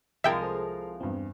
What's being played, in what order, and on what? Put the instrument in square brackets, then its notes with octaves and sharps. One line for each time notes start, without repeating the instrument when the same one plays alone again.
[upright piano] C2 F5 [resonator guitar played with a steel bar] F3 G#3 A#4 [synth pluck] E5 G5
[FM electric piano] G#4 A4 C5
[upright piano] E2 G2 [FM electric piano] C4